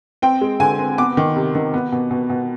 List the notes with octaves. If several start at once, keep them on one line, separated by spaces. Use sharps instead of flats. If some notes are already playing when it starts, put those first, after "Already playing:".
C4 G5
G#3
D3 G#5
C4
B3 D6
D#3
C3
D#3
B3
B2
B2
B2